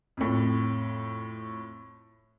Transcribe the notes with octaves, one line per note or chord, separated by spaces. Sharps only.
F2 A2